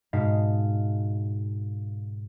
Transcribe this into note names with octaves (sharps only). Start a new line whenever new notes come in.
G#2 B2 G#3 F5 A5 B6